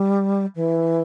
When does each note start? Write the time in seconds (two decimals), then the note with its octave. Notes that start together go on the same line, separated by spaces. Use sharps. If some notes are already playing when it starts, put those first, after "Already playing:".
Already playing: G3
0.56 E3